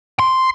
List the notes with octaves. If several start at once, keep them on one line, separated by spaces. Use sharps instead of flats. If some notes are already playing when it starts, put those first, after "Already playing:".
C6